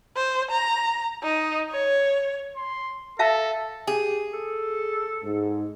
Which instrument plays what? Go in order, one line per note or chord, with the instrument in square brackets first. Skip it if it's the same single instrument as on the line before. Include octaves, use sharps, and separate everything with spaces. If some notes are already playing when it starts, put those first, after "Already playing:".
[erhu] C5
A#5
D#4
C#5
[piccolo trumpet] C6
[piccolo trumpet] A4 [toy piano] E5 F5 A5
[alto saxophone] G4 [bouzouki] G#4
[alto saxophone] A4
[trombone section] G#2